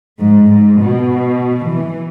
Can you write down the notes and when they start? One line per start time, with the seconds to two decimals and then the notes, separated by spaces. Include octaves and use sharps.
0.22 G#2
0.52 G#2
0.81 B2
1.70 E3